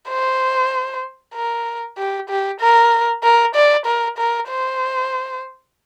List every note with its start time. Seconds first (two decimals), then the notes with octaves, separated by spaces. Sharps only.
0.09 C5
1.34 A#4
1.98 G4
2.29 G4
2.61 A#4
3.23 A#4
3.55 D5
3.86 A#4
4.18 A#4
4.49 C5